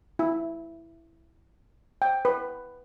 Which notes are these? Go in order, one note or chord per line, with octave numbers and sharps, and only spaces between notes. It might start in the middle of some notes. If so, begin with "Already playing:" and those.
E4
G5
B4